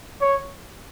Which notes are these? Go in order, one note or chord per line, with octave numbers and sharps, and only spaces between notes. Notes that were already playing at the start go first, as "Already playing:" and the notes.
C#5